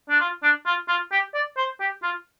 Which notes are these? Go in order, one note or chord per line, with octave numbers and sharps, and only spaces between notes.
D4
F4
D4
F4
F4
G4
D5
C5
G4
F4